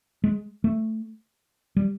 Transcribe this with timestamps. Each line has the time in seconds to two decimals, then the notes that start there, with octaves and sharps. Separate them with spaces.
0.24 G#3
0.64 A3
1.76 G3